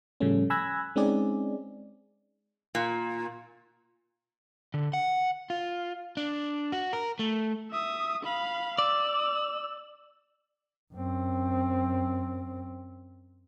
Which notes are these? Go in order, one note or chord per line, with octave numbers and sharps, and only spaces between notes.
A2 C#3 F3 G3 A3 C#4
G#5 B5 E6 F#6 G#6 A#6
G#3 C4 C#4 D#4 G#4 D5
A#2
D3
F#5
F4
D4
F#4
A#4
A3
E5 D#6
F5 B5
D5 E6
F#2 C4